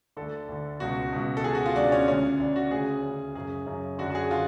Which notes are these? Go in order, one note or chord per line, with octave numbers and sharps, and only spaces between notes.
D2 D3 A4
D2 D3
C#2 B2 F#4
C#2 B2
A4
C#2 B2 G#4
F#4
F4
C#2 B2 D4
C#4
D2 C#3 C#4
D2 C#3 D4
F#4
D2 C#3 G#4
D2 C#3
F#2 C#3 G#4
F#2 C#3
F#2 D3 F#4
F#4
G#4
D3 F4